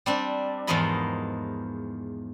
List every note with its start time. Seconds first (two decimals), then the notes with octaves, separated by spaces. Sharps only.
0.06 G3 C4 D4
0.67 E2 G#2 F3 A#4 D#5 B5